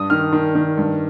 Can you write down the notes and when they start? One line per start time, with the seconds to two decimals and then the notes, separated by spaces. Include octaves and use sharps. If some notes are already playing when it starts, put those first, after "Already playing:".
Already playing: G2 D#6
0.10 D#3 F6
0.33 D#3
0.55 D#3
0.78 G2